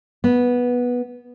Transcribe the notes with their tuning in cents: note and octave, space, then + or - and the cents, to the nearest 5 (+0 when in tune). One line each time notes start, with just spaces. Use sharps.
B3 -10